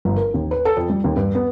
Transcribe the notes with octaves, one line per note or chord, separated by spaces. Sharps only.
G1
A#4
D#2
B4
A4
F2
G3
D#2
G2
B3